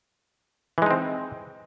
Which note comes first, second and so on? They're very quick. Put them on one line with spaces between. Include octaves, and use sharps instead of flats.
E3 G#3 D#4 C4